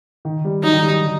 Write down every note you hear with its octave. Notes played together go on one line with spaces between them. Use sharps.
D#3
G3
F#3 D#4
D#3
G3
D3